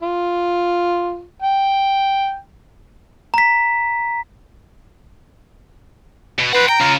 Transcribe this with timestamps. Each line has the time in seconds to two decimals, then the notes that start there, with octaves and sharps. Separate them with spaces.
0.02 F4
1.42 G5
3.34 A#5 B6
6.39 B2
6.53 B4 C5 F#5
6.69 G5 A#5
6.81 C#3 F4